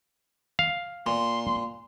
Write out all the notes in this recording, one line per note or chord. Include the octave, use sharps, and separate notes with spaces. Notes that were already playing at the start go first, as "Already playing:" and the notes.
F5
A#2 C6